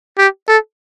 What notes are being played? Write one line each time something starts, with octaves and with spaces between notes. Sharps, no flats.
G4
A4